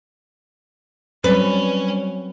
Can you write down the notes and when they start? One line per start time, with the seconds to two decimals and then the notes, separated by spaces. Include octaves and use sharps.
1.24 F#3 G3 C4 C#4 B4